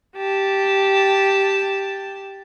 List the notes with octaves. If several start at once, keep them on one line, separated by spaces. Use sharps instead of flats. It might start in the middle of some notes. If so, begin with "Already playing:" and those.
G4 A5